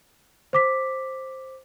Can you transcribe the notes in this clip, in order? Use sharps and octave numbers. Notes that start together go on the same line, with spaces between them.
C5 D6 B6